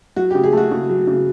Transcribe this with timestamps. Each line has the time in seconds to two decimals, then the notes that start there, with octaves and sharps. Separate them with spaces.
0.16 F#3 F#4
0.30 G4
0.35 C#3
0.44 G#4
0.53 A3 F#4
0.71 C#3
0.90 F#3
1.07 C#3